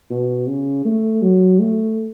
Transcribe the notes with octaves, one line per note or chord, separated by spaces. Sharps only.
B2
C#3
A3
F#3
A3